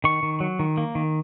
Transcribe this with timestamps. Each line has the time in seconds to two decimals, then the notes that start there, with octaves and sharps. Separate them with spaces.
0.04 D#3 C#6
0.23 D#3
0.40 F#3
0.59 D#3
0.77 A#3
0.95 D#3